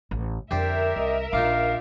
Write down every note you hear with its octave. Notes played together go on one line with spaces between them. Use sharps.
A1
F2 D3 G4 A#4 C5 D5 E5
C2 D#5
A#1 D#4 F4 F5 D6